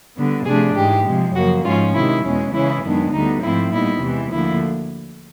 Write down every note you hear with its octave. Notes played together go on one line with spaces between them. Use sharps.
D3 G3 B3
C3 F3 A3 D4 G#4
G#2 E3 G#3 G4
C3 F3 G#3
F#2 C#3 F3 A#3 F#4
G#2 F3 G#3 C#4 F4
C3 D#3 G#3 E4
E2 B2 G#3 C#4
C#3 E3 G#3 C#4 E4
F#2 D#3 G#3 B3 D4
D2 D3 G3 B3 D#4
G#2 F3 A3 C4 E4
A#2 G3 B3 D#4 E4
E2 C3 E3 G#3
D2 D3 F3 A#3 E4